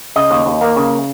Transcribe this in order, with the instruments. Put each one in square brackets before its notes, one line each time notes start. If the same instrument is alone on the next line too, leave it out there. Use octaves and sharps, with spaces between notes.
[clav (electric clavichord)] C#3 D#5
D#2
D#2
A#3
C#3